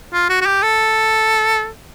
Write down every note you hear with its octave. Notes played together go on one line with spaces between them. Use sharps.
F4
F#4
F#4
G4
A4